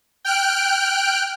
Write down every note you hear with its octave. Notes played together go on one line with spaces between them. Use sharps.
G5 F6 F#6 D7